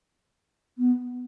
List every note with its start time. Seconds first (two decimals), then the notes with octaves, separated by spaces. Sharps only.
0.78 B3